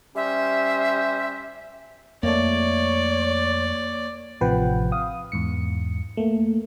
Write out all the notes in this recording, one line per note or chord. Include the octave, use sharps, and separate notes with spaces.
G3 C#4 C5 E5
F2 A3 A#3 C#5 D5
A1 C3 F3 B4 F#5 G5
F5 D#6
E2 G#2 C#7
A3 A#3